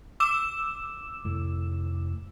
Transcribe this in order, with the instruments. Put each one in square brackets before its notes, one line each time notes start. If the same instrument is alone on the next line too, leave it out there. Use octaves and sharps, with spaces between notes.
[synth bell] D6 E6 E7
[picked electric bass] F1 A2